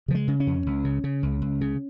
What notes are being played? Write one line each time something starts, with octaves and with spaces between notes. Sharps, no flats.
C#3 F3
G#3
C#3
C#4
F2
C#2
C#3
C#3
C#2
C#2
C#3